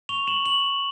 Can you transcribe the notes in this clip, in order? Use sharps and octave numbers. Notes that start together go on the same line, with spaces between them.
C#6 F7 G7
E7 F#7
C#6 E7 F#7